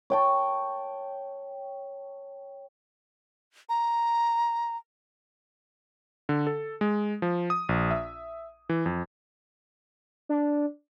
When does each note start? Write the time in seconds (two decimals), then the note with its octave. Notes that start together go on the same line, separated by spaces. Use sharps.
0.10 C#5 G5 A5
3.69 A#5
6.29 D3
6.47 A4
6.81 G#3
7.22 F3
7.50 D#6
7.69 A#1
7.91 E5
8.69 E3
8.86 F2
10.29 D4